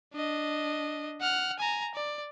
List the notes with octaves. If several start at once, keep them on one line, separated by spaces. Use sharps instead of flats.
D4 D#5
F#5 F6
G#5 A#5
D5